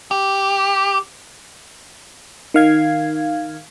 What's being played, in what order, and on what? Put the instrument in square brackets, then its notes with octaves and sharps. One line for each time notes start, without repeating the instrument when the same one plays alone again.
[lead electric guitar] G4
[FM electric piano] D#3 F5 G#6